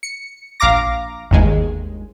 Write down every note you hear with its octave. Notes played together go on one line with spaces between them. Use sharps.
C#7
A#1 F5 A#5 D6 A#6
G1 D#2 G#3